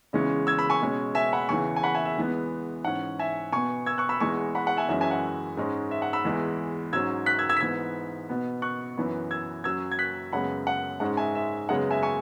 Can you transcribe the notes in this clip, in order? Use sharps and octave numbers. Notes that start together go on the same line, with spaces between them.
E2 C#3 E3 G#3 C#4
E6 G#6
B5 E6
G#5 C#6
B2 G#3 C#4
E5 G#5
F#5 B5
E2 C#3 E3 G#5 C#6
G#5
F#5 B5
E5 G#5
E5
E2 E3 G#3 B3
G#2 E3 C#4 F#5
E5 G#5
B2 B3 G#5 C#6
E6 G#6
C#6 F#6
B5 E6
E2 E3 G#3 B3 G#5 C#6
F#5 B5
F#5
E5 G#5
F#2 E3 G#3 C#4 E5
E5 G#5
F#5
G#2 G#3 C#4
E5
F#5
B5 E6
E2 E3 G#3
G#2 F#3 C#4 E6 G#6
F#6 B6
E6 G#6
E6 G#6
B6
G#2 E3 B3 E6 G#6
B2 B3
C#6 F#6
F#2 E3 B3
E6 G#6
F#2 F#3 C#4 E6 G#6
G#6
F#6 B6
F#2 C#3 G#3 B3 F#5 B5
F#5
G#2 G#3 C#4 F#5
E5 G#5
E5
F#2 C#3 G#3 B3 F#5
E5 G#5
G#5 C#6